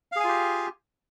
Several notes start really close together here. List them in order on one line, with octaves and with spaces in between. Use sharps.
F5 G#4 G#5 F4 G4